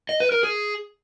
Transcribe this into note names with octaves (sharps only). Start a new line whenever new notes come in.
D#5
B4
A#4
G#4